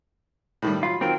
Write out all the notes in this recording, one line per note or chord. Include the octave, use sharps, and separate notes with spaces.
A2 D#3 G3
F#3 F4 B5
D#3 F#3 C4 F4 A#4